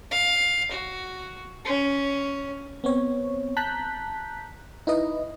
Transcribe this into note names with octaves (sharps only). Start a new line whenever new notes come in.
F5
F#4
C#4
B3 C4 C#5
A5 A#5 F#6 G6 B6
D#4 E4 B4 D#5